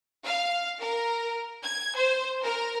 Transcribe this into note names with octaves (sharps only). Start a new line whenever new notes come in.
F5
A#4
G#6
C5
A#4